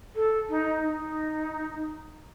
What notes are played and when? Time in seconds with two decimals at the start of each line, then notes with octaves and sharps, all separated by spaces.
0.16 A4
0.50 D#4
0.84 D#4